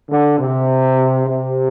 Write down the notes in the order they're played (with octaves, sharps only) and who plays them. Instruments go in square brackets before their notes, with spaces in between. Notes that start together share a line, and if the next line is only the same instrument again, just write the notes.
[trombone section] D3
C3
C3